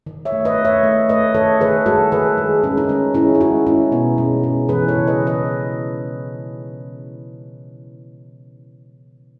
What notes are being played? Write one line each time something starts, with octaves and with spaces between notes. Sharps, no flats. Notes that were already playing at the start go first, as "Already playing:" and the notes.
D#3
C#5 E5
A3
B4 D#5
A3
C#5 E5
A3
A3 B4 D#5
D#3 A4 C#5
D#3 G#4 B4
G#3 F#4 A4
D#3 G#4 B4
G#3
G#3 C#4
D#4
D#3 C#4
G#3 C#4 E4
E4
G#3 D#4 F#4
G#3 C#4 E4
B2 B3 D#4
G#3 C#4
G#3 C#4
E3 G#4 B4
A4 C#5
C#3
B4 D#5
E3
B4 D#5